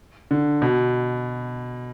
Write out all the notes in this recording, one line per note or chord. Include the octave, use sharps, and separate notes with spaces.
D3
B2